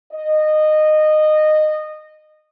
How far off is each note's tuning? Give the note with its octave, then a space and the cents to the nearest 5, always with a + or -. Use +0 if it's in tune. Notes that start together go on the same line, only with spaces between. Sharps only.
D#5 -15